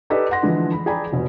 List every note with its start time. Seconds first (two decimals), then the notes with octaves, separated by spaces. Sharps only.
0.10 D#4 G4 A4 B4 D5 D#5
0.31 F#5 C6 A#6
0.43 D3 E3 F3 G#3
0.72 B5
0.86 G#4 D5 G5 G#5 A#5 B5
1.13 F1 B2